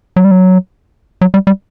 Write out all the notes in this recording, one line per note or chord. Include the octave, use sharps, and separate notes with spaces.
F#3
G3
F#3
F#3
G3
G3